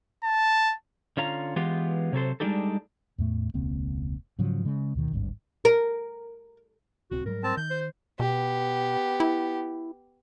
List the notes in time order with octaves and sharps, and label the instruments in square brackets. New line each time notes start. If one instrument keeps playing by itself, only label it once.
[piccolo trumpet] A5
[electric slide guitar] D3 C#4 F4 A#5
E3 G#3 B3 F4 G4
C3 F#3 A4 C5
G3 G#3 D4 D#4 G4 A4
[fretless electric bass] E2 A2 A3
E1 C#2 A#3 C4
G#2 C#3 F3 F#3
C#3 G#3
D2 B2 D#3
D1 G#1 G2
[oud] A#4
[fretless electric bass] D1 C2 C4 [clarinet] F#4
[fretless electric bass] G#2 F#3 G3 [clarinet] A#4
[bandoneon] C4 A5
[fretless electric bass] D#3 [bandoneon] G6
[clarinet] C5
[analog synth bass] B2 [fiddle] B3 G4
[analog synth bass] E4